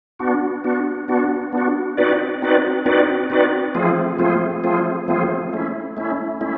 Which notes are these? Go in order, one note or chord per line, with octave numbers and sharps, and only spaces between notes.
B3 D4 F#4
B3 D4 F#4
B3 D4 F#4
B3 D4 F#4
C4 D#4 F#4 B4 D5
C4 D#4 F#4 B4 D5
C4 D#4 F#4 B4 D5
C4 D#4 F#4 B4 D5
F3 A3 C4 F4 G#4
F3 A3 C4 F4 G#4
F3 A3 C4 F4 G#4
F3 A3 C4 F4 G#4
A3 C#4 E4
A3 C#4 E4
A3 C#4 E4